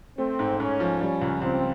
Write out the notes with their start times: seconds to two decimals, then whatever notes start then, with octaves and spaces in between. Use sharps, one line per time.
0.18 A3 C4
0.39 G#2
0.59 G#2 C#4
0.80 F3
1.00 G3 C#4
1.21 C#2
1.42 C#2 C4